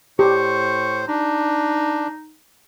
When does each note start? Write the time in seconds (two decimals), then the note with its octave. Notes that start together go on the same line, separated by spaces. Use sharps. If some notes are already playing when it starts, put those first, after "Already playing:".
0.19 A2 G4 C5 C#6
1.08 D4 D#4